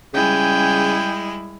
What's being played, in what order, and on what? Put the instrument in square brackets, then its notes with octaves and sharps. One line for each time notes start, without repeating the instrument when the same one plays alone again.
[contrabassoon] C#3 [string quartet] G3 G#3 E4 [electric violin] G5 G#5